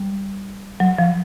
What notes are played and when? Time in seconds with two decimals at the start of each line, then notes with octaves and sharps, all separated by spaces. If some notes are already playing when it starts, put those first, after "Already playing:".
Already playing: G3
0.80 F#3
0.99 F3